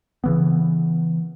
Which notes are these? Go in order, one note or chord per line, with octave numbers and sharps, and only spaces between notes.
C#3 E3 B3